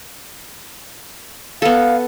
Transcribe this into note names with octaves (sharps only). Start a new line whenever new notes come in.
B3 A4 F5